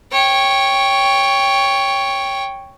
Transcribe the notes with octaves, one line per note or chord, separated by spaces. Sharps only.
C#5 G5